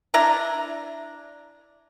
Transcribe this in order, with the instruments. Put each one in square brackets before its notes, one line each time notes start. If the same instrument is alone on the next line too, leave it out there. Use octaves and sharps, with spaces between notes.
[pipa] D4 E4 A#5